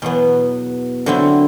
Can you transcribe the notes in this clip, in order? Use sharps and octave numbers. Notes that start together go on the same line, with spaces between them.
E2 B2 F#3 B3
D3 F#3 C4 E4